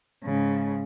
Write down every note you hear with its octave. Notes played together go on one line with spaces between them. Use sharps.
G#2 C#3